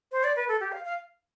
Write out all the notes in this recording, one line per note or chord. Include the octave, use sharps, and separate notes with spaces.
C5
D5
B4
A4
G4
F5
F5